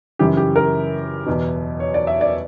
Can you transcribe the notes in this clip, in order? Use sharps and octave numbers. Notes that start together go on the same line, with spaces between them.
F#2 C#3 E3 G4
G4
A#4
E2 B2
C#5
D5
E5
D5